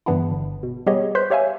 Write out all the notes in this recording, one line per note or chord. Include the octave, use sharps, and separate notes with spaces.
G2 C#3 E3 B3 D4 E4
G1
B2
G3 B3 G4 G#4 C#5 D#5
B4 C5 C6 F#6 G6 B6
G4 C#5 E5 F5 G#5